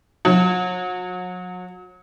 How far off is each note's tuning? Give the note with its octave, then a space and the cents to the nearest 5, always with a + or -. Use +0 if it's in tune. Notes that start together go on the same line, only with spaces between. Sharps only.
F#3 -35